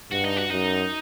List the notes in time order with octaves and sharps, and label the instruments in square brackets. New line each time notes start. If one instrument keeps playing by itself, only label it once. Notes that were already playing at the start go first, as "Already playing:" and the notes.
[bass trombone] G2 [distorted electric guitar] F#4
[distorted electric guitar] D#4
F#4
[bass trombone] F#2 [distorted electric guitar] D#4